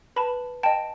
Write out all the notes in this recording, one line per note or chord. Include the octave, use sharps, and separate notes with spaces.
B4 A5 B5
D#5 G5 A5